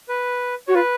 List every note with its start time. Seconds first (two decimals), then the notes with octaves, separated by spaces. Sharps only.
0.09 B4
0.68 F#4 C#5
0.75 F4 B4